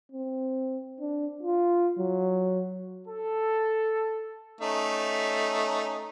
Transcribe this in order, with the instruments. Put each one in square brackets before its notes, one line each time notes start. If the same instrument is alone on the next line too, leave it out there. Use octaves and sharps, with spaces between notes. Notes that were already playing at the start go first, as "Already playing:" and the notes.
[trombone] C4
D4
F4
F#3
[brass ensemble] A4
[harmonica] A3 C#4 D#4